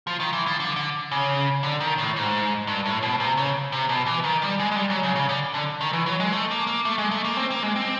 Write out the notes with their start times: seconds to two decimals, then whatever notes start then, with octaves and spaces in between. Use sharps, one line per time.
0.07 F3
0.20 D#3
0.33 E3
0.47 F3
0.60 D3
0.76 D3
1.11 C#3
1.63 D3
1.80 D#3
1.98 A2
2.16 G#2
2.67 G2
2.85 A2
3.03 B2
3.20 C3
3.37 C#3
3.72 C3
3.89 B2
4.06 E3
4.24 D#3
4.42 G3
4.60 G#3
4.71 G#3
4.76 G3
4.90 F#3
5.03 C#3
5.16 C#3
5.29 D3
5.54 D3
5.81 D#3
5.93 E3
6.06 F#3
6.20 G#3
6.32 A3
6.51 A#3
6.67 A#3
6.85 A3
6.98 G#3
7.11 A3
7.24 A#3
7.37 C4
7.51 A#3
7.63 G#3
7.76 C4